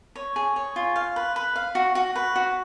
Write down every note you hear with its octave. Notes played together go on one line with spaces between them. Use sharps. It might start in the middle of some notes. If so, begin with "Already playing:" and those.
C#5
G#4
C#5
F4
F5
B4
B4
F5
F#4
F#4
B4
F#4